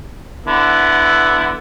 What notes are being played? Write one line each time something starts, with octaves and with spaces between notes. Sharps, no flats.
D3 B3 E4